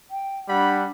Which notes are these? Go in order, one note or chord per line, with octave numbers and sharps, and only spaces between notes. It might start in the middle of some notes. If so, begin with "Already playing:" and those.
G5
G3 D4 F#5 B5